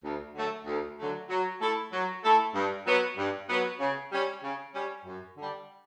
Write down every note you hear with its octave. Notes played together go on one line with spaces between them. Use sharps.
D2
D3 F#3 A3
D2
D3 F#3 A3
F#3
A3 E4 A4
F#3
A3 E4 A4
G2
F#3 B3
G2
F#3 B3
C#3
G3 C#4
C#3
G3 C#4
F#2
D3 G3 D4